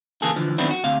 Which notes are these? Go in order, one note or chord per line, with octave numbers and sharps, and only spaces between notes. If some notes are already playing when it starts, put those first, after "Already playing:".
C#3 E3 A#3 G#4 A4
D3 E3 F3
D#3 F#3 B3 C4 D4 E4
F#4
D2 C3 F5